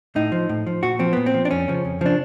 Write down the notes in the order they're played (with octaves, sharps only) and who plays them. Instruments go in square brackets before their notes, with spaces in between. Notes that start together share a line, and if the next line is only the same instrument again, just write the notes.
[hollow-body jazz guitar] A2 D#4
F3
A2
F3
A#2 F#4
F3 C4
A#2 B3
C4
F3
D4
F2 C#4
C#3 F3
F2
C#3 F3 D4